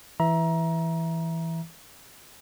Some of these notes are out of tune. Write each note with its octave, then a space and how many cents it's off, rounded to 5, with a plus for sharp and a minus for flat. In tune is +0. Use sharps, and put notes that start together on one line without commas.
E3 +0 E5 +0 A#5 +25